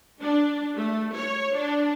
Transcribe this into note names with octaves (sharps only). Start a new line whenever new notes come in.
D4
A3
C#5
D4